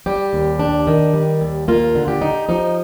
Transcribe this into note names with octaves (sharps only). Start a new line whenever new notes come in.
G3 G4
D#2
D4
D#3
G3
D#2
A#3 F4
D3
G4
D#4
F3 D#4